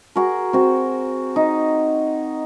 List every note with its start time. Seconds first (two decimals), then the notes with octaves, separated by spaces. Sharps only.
0.16 F#4 G#4 A#4
0.53 C4 F#4
1.36 D#4